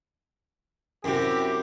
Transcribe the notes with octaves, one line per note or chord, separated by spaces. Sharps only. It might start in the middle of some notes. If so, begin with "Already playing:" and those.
F#2 C3 E4 G4